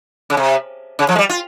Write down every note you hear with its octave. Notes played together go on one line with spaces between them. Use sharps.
C#3
C3
C#3
F3
G#3
G3
F4